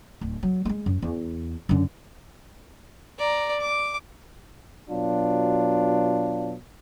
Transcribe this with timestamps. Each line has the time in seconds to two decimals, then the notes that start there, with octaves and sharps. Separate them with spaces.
0.21 D1
0.43 F#3
0.65 G#3 A3
0.86 F#2
1.02 E2
1.69 F#2 D3
3.19 D5 A#5
3.60 D6
4.90 B2 F#3 D4 F4